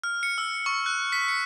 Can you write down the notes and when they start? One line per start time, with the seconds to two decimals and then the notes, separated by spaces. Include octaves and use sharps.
0.04 F6
0.23 C#7
0.38 E6
0.66 C#6
0.86 F#6
1.12 B6
1.28 C#7